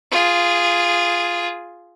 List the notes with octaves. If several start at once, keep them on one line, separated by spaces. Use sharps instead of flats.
F4 G#4